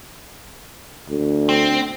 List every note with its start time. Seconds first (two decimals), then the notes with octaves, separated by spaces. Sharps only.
1.09 D2
1.49 C4